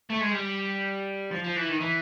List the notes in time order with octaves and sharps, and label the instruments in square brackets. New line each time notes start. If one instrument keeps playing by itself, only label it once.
[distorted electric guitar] A3
G#3
G3
F3
F3
E3
D#3
E3